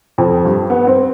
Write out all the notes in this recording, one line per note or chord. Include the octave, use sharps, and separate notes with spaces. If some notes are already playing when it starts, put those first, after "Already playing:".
F2
G2
B3
C4